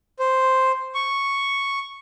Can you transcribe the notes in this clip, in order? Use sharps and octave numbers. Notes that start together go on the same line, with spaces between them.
C5
C#6